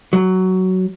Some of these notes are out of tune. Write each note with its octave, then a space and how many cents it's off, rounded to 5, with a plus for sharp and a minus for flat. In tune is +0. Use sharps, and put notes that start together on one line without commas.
F#3 +10